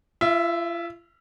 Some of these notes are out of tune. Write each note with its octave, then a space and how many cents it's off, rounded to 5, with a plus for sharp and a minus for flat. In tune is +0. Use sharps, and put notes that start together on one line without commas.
F4 -40 E5 +0